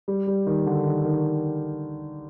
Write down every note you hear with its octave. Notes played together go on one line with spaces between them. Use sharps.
G3
G3
D#3
D3
D#3
D#3